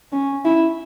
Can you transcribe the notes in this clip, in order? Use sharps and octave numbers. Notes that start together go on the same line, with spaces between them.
C#4
E4